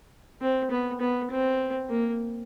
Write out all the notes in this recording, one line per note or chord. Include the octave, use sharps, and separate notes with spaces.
C4
B3
B3
C4
A#3